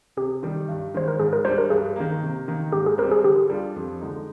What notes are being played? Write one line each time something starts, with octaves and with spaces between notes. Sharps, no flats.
C3 G4
D#3 G3
G2
D#3 G#3 C5
A#4
G#2 G#4
A#4
G3 D4 C5
A#4
G2 G#4
D#3 A#3
C3
D#3 A#3
G#2 G4
G#4
G3 C4 A#4
G#4
D3 G4
G3 D4 F4
F2
D3 G#3 D#4